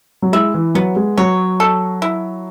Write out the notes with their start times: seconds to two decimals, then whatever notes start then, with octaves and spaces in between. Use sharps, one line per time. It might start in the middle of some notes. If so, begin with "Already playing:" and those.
0.22 F#3
0.32 G#3 E4
0.54 E3
0.75 F#3 B3
0.96 G#3
1.18 F#3 C#5
1.60 A4
2.02 E4